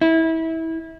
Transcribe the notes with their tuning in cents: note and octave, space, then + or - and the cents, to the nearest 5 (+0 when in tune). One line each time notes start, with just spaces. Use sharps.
E4 -25